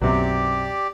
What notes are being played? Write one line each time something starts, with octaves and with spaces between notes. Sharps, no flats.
B1 F#2 C3 F#3 G4 D5